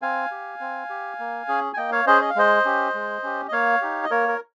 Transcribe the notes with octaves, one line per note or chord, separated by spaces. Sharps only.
C4 F5 G#5
G4
C4
G4
A#3
C#4 G#4
G#5
A#3 D#5 G5
C#5 F5
C#4 G#4 C5 D#5
D#5
F5
G#3 C5 D#5
C#4 G4
G#3
C#4 G4
D#5
A#3 C#5 F5
D#4 G4
D#5
A#3 A#4 C#5
A#4